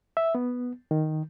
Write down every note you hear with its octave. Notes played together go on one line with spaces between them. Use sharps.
E5
B3
D#3